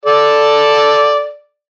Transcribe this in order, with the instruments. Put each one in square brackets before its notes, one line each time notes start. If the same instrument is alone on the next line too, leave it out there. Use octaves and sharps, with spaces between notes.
[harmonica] A4 D5